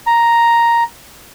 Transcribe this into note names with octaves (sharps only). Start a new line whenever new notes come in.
A#5